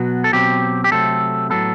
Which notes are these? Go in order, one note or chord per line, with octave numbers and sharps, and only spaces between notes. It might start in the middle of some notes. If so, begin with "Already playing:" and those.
Already playing: B2 F#3 B3 F#4
A4
B2 F#3 C4 G4
G4
C3 F#3 A3 C4 A4
A2 F#3 B3 A4